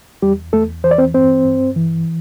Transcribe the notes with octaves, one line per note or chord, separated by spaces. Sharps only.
E2 G3 G4
E2 A3 A4
E3 C5
D5
C4 C5
G2 C4 C5
G2
E3